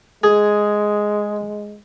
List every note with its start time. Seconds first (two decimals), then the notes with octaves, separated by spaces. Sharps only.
0.24 G#3 G#4